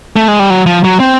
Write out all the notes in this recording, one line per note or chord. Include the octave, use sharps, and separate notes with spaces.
A3
G#3
G3
F#3
F3
F#3
C4